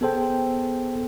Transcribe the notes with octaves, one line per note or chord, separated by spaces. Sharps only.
B3 G#4 A4 C5 G5